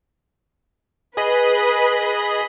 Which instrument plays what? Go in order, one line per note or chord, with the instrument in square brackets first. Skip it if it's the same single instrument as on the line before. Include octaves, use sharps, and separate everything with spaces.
[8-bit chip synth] G#4 D#5 B5 [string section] B4